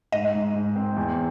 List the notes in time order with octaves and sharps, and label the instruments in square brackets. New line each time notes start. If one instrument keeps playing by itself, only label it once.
[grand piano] G#2 [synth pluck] D#5
[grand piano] G#2
G#2
C4
E2